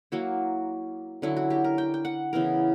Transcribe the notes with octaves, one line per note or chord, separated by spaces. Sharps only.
F#3 A#3 E4 F#4
D3 F#3 C#4 E4
F#4
G4
A#4
G5
G5
F#5
C#3 E3 B3 E4 A#4